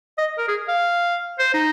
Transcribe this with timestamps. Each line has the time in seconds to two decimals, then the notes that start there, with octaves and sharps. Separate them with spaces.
0.18 D#5
0.38 A#4
0.48 G#4
0.68 F5
1.39 C5
1.54 D#4